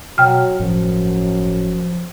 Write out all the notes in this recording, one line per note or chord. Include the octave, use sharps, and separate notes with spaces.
B2 F#3 G5 F6
G1 F#2 A2 F3 C#4